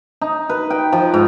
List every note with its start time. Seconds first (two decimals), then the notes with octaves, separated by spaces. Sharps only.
0.21 D#4
0.49 B4
0.70 G5
0.93 F3
1.14 G#2